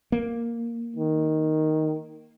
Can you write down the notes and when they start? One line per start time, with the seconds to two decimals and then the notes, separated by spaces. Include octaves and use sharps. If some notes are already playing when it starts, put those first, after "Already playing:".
0.12 A#3
0.96 D#3